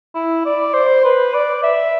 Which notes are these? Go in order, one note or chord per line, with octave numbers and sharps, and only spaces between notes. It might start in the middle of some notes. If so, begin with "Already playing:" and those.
E4
D5
C5
B4
D5
E5